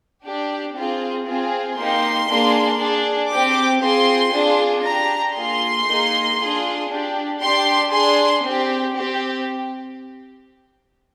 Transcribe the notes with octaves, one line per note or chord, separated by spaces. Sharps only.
D4 G4
C4 F4 G#4
C4 F4 G#4
A#3 D#4 G4 C6
A#3 D4 G#4
D4 G#4
C4 G4 D6
C4 F4 G#4 C6
D4 F4 G#4
D4 G4 A#5
A#3 F4 G#4 C6
A#3 D#4 G#4
D4 F4 G#4
D4 G4
D4 G4 C6
D4 G#4 C6
C4 G4
C4 G4